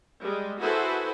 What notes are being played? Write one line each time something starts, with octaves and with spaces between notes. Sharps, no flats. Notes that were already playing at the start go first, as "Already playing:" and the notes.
G3 G#3
E4 F#4 G#4 A4 B4 C5